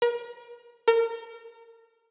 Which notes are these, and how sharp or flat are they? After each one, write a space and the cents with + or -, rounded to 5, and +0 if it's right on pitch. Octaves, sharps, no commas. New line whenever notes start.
A#4 +40
A#4 -30